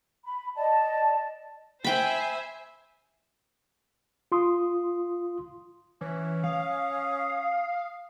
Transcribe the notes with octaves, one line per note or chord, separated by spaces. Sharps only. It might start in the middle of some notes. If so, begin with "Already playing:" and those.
B5
D5 D#5 A5
C5 E5 G5 G#5 B5
F4 C6 D#6
E3 C#4
F5 D#6